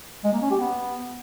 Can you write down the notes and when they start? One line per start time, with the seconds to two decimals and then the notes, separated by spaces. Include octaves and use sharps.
0.24 G#3
0.33 A#3
0.42 C#4
0.51 G4
0.60 B3